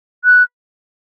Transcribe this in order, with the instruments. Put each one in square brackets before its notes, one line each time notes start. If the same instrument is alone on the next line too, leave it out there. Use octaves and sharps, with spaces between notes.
[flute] F#6